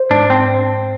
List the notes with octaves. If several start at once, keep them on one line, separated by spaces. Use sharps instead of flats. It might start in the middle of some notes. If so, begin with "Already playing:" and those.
Already playing: C5
G#2 D4
G#2 C4